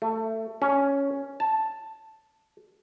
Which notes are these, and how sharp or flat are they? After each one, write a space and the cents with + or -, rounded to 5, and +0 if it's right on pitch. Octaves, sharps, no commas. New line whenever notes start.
A3 +20
C#4 +5
A5 +0